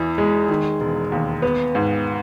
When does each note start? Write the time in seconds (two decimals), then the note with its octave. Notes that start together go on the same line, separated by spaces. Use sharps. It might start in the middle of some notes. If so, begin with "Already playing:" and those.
Already playing: E2 E3
0.18 G#3
0.49 D#3
0.81 E1
1.12 D#2
1.42 B3
1.75 G#2